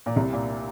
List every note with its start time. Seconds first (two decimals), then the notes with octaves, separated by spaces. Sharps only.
0.06 A#2
0.16 C2 C3
0.33 A#2